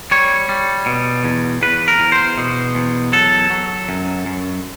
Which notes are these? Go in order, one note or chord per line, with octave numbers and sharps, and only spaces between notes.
G3 C#5
G3
B2
E2
E2 B4
A#4
E2
C5
B2
E2
F#3 A4
F#3
F#2
F#2